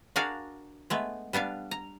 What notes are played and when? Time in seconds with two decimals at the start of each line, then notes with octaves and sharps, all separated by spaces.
0.16 D4 F#4 G#4 A#4 D5 F5
0.90 G#3 A3 B3
1.33 G3 B3 D4 F5
1.71 A#5